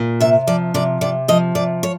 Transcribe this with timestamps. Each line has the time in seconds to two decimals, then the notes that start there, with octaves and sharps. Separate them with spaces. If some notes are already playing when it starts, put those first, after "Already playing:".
Already playing: A#2
0.20 C3 E5
0.47 F3 D5
0.74 C3 D5
1.01 C3 D5
1.28 F3 D#5
1.55 C3 D5
1.83 C#5